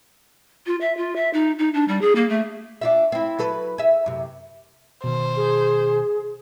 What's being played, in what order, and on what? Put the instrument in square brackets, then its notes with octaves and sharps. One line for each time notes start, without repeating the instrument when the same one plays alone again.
[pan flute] F4
E5
F4
E5
D#4
D#4
D4
G3
G#4
A#3
A3
[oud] D4 F4 E5
C4 E4
F#3 A4 B4
G#4 E5
F#2 C3
[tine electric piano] B2 D#3 [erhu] C5
[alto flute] G#4